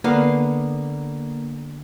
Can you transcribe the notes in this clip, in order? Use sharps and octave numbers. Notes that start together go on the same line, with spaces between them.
D3 A#3 B3 F5